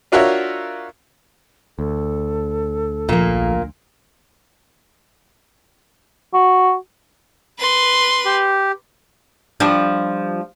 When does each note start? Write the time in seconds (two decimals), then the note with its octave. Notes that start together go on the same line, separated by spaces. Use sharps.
0.12 D4 F4 F#4 A#4 C#5 E5
1.79 D2 A4
3.09 A#1 A#2 F3 A#3
6.34 F#4
7.59 B4 C6
8.25 G4
9.60 F3 G3 D4